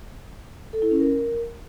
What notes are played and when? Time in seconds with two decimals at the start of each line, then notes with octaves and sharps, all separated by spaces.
0.73 A4
0.82 E4
0.91 C#4
1.00 A#4